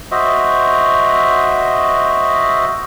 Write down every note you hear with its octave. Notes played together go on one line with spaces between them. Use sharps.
F#4 C5 D#5 E5